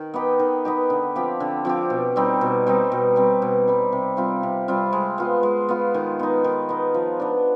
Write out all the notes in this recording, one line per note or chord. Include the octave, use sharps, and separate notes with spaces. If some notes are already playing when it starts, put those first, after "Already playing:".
Already playing: D#3
B3 D#4 G4
D#3
B3 D#4 G4
D3
F3 C4 G4
D3
F3 C4 G4
B2
G3 C4 D#4
B2
G3 C4 D#4
B2
G3 C4
B2
G3 C4
C3
G3 C4 F4
C3
G3 C4 F4
G#3
B3 F4
G#3
B3 F4
D#3
B3 D#4
D#3
B3 D#4
F3
B3 D4